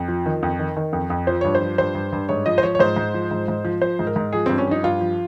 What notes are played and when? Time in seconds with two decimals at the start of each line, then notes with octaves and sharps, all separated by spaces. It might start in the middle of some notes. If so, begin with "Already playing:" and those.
Already playing: F2
0.08 F3
0.26 D#3
0.43 F2
0.59 D#3
0.77 D#3
0.93 F2
1.10 F2
1.27 F3 C5
1.41 G2 C#5
1.55 C5
1.62 F3
1.78 G2 C5
1.95 G2
2.12 G2
2.29 G#2 C#5
2.46 F3 D#5
2.58 C5
2.63 F3 C#5
2.75 C#5
2.79 G#2 C5
2.96 G#2
3.14 F3
3.31 G#2
3.48 G#2
3.65 F3
3.82 F3 C5
3.99 G#2
4.07 A#4
4.16 G#2
4.33 F3 G#4
4.46 G2 C4
4.58 C#4
4.67 F3 D#4
4.83 G2 F4
5.01 F3